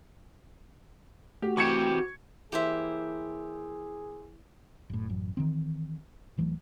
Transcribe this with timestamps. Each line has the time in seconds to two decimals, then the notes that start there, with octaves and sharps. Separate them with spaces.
1.42 A3 F#4 G4
1.57 E3 C4 G4 C#6 G#6 C#7
2.52 E3 A#3 E4 G4 G#4 C5 E5
4.90 F#1 A2
5.09 A1 F#2
5.37 D#3 E3 C4
6.37 D1 E3 F#3 A3